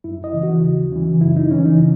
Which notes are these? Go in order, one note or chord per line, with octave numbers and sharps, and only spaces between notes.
F#2 E4
D#5
C#3 E3
F#4
D#2
C#3 E3
F#2 E4
D#4
C#3 E3 C#4
D#4